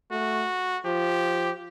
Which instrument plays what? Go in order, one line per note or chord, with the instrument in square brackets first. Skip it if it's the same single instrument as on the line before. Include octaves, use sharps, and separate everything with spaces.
[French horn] A3 [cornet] F#4
[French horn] F3 [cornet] G4